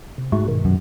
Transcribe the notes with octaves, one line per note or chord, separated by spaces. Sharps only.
C3
G#2 A3 F#4
G2 B2 D#3
F#2